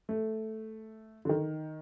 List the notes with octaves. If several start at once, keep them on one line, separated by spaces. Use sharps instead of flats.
A3
D3
D#3